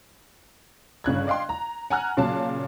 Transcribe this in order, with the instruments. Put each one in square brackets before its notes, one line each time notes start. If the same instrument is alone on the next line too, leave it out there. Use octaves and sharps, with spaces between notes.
[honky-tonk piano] G1 C#3 F#6 G#6
D5 D#5 F5 G5 C6
A#5
F#5 G#5 A#5 F6 F#6
A#2 C#3 F#3 C#4 F5 A5